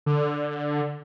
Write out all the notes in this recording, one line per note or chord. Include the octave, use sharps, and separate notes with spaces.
D3